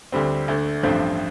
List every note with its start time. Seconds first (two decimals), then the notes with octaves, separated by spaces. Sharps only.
0.12 D2 D3 G3 C4
0.48 D2 D3 A3
0.83 A1 G2 F3 A3 C4